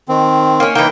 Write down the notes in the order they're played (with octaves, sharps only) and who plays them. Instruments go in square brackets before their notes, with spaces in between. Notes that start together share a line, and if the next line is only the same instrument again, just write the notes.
[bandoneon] D#3 C4
[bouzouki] A#3 C#4
[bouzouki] E3 A#3 [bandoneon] D#4 G5